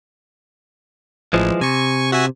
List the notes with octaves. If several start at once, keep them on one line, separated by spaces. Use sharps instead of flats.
A1 E3 F3 G#3
C3 G#5 C#6
F#4 E5 G#5